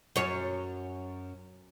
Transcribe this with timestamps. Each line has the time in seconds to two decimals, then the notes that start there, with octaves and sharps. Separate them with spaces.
0.16 F#2 C#5